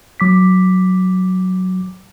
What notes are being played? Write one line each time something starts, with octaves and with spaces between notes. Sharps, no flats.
F#3 D6 B6